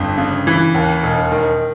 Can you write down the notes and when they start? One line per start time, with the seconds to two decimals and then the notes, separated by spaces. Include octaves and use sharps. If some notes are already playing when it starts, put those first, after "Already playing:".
Already playing: G1 F2
0.18 C#3
0.47 E3
0.74 D#2
1.03 E1
1.32 D#3